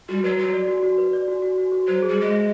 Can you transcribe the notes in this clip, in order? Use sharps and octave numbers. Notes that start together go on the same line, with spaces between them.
G3 F#4
F#3 B4
F#3 F#4
D5
F#4
F#4
B4
D5
F#4
F#4
F#4
F#4
F#3 C5
G#4
G3
G#3 G#4
E5